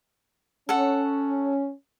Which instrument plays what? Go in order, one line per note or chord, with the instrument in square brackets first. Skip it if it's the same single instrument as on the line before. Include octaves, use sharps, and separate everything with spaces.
[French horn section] C#4 [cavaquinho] A4 F#5